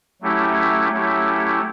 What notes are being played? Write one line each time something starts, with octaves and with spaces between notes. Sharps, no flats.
F#3 A3 C#4 E4 G4
F#3 A3 C#4 E4 G4